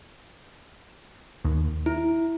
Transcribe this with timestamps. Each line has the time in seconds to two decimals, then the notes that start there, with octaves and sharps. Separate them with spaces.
1.45 D#2
1.86 E4